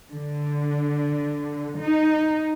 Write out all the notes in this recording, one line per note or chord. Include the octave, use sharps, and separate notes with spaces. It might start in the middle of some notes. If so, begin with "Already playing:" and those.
D3
D#4